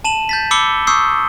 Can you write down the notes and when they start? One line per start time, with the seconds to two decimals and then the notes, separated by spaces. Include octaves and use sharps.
0.04 A5 D#7 E7 F#7
0.29 G6 A6 B6
0.51 B5 D6 E6 C7 C#7 G7
0.87 C#6 D#6 E6 G6 C7